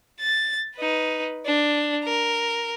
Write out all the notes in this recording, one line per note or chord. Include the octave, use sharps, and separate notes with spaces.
A6
D#4 B4
D4
A#4